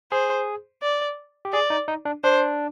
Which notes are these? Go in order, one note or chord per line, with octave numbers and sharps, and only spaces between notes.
G#4 C5
D5
G4
G#4 D5
D#4
D#4
D4
D4 C5